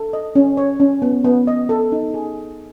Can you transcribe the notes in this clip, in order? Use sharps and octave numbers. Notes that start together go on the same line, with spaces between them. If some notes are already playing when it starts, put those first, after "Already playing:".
Already playing: A4
D#5
C#4
C#5
C#4
B3
B3
D#5
A4
D#4
G#4